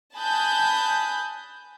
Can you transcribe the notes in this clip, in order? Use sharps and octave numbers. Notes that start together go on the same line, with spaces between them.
G#5 A5 B5 D#6 F#6 G6